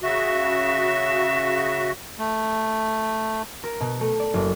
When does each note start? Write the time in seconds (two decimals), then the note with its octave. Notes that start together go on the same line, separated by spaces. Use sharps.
0.03 C#3 F#4 E5
2.19 A3
3.64 A#4
3.81 B2
4.01 A3
4.20 D5
4.34 F#1